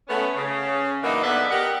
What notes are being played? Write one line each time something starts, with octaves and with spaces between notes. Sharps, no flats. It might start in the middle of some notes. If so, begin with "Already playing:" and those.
A3 B3 C#4
C#3
E3 F#3 A#3 B3 D4 D#4
G#2 B3 D4 A4 D5 E5
G4 A#4 D#5 F#5